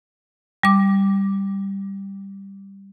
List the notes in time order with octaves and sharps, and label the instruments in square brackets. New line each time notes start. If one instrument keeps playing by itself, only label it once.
[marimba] G3 D6